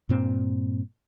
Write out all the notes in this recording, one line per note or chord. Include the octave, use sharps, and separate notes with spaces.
G2 A#2 C4